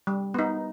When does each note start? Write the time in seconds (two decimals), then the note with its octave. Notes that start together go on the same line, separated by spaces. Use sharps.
0.07 G3
0.34 B3 D#4